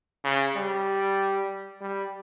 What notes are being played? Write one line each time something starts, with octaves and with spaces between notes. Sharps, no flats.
C#3
G3
G3